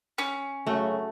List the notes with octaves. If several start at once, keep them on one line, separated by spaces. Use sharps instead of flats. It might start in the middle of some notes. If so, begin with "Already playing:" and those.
C#4
F#2 C#3 A3 F#4